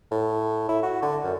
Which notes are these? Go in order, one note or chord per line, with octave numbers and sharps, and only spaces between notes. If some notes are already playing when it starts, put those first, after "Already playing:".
A2
E4
F#4
D3
F#2